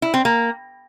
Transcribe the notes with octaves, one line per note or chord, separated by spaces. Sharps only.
E4
C4
A#3